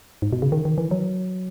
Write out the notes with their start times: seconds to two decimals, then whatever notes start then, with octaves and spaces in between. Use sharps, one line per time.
0.22 G#2
0.33 B2
0.42 C#3
0.52 D#3
0.65 D#3
0.78 E3
0.91 F#3